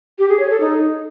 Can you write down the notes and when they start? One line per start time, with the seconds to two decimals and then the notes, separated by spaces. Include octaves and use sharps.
0.19 G4
0.29 G#4
0.40 C#5
0.50 A4
0.60 D#4